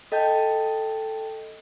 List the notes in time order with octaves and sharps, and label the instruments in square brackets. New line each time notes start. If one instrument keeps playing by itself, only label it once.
[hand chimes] A4 D#5 G5 A5 G6